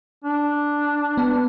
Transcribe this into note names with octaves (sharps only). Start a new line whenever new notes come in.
D4
B3